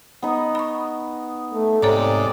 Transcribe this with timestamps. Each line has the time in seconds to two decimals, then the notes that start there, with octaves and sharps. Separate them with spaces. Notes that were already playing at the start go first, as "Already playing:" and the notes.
0.22 B3 D#4
0.55 B5 C#6
1.54 A3
1.82 G#2 C3 A4 C#5 D5 A#5